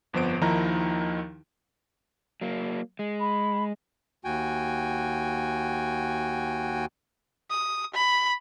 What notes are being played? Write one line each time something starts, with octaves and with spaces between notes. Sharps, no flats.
G1 F2 F3 B3 C5 D7
D#2 D#3 F3 D#4 E4 A#5
F#3 A#3
G#3
B5
D#2 F#4 G5 G#5
D#6
B5